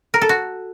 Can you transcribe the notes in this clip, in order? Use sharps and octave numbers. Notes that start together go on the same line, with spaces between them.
A#4
A4
F#4